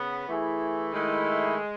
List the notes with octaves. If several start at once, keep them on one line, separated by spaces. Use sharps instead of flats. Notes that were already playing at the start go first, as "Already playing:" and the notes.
Already playing: C#3 B3
E3 A3 E4 G#4
D#3 G#3 A3 E4